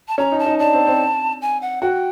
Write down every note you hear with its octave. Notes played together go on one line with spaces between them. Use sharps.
A5
C#4 A#5
D#4
A5
D#4
D4 A5
C4
C4
G#5
F#5
F#4 G5